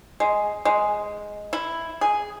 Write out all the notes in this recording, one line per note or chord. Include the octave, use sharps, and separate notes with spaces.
G#3
G#3
E4
G#4